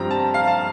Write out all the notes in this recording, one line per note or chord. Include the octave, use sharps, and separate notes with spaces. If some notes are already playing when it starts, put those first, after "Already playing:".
Already playing: G2 F3 C4 A#5
A5
F5
A5